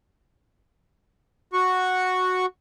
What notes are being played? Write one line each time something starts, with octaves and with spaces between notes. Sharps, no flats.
F#4 C#6